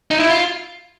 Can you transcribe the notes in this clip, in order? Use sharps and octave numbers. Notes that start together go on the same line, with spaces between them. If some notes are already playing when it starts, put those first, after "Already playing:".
D#4
E4
F4